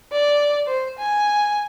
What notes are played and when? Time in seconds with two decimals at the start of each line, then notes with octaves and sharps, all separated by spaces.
0.12 D5
0.67 C5
0.99 G#5